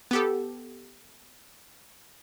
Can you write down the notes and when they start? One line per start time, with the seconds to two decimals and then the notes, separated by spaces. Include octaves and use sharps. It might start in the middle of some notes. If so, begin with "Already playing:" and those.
0.11 B3 G4 A4